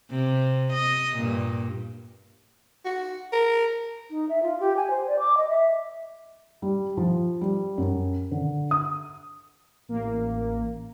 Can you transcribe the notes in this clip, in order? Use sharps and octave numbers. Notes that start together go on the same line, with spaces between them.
C3
D#5
G2 A#2
F#4
A#4
D#4
E5
F4
G4
G#5
C5
D5
D6
D#5
E5
G3
F3
G3
F#2
D3
D#6
A1 A#3